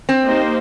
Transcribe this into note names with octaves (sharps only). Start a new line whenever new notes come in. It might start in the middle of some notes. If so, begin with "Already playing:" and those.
C4
A#3 D#4 G4 C5